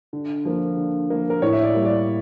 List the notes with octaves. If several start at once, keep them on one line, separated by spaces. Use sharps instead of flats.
D3
F3 A#3
D3
F3 A#3
A#4
A2 C#5
E5
D5
G3 A#3
D5